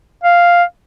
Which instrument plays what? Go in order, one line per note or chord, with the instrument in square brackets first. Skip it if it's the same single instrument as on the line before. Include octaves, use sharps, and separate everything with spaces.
[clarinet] F5